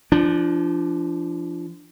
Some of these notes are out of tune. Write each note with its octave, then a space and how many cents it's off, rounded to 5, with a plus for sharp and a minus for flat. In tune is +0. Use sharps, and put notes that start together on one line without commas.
F3 -30 D4 +0